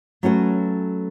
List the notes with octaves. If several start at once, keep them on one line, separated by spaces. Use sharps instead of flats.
F#3 A3 C#4 F#4 B4